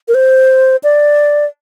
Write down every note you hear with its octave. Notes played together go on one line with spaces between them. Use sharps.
A#4
C5
D5